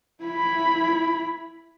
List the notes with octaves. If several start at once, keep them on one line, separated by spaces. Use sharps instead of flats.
E4 B5